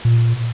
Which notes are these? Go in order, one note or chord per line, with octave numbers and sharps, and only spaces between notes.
A#2